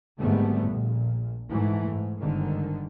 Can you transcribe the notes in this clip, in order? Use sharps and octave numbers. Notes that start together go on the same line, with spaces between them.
G#1 G#2 D3 G3 A3 B3
A#1 A#2
G#2 E3 A3
G#2
G1 G#2 D3 D#3